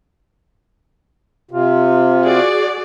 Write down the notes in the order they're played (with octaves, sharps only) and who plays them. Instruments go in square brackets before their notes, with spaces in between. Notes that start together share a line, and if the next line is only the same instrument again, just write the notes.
[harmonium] C3 [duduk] F4
[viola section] F#4 G#4 D5